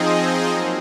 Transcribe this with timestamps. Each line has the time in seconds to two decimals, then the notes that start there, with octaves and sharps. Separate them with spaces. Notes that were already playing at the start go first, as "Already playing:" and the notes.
Already playing: F3 C4 D#4 G#4 D#5
0.50 F#3 A#3